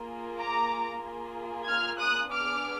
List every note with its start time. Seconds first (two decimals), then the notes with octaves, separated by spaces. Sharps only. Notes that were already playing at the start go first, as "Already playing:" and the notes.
Already playing: A#3 F4 G#4
0.38 A#5 D6
1.03 A#3 F4 G#4
1.68 F6 G#6
2.00 D#6 F#6
2.32 B3 D4 G#4 D6 F6